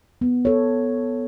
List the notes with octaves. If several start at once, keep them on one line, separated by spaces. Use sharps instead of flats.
B3
A4 C#5